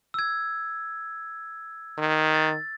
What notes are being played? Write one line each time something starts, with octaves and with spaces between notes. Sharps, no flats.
E6 G#6
D#3
A6